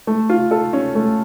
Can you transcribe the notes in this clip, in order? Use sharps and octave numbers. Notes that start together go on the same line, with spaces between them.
A3
F4
A4
C#4
A3